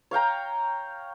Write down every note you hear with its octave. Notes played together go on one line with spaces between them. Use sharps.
C#5 F5 G5 A#5